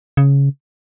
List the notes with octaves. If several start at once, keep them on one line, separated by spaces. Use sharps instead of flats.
C#3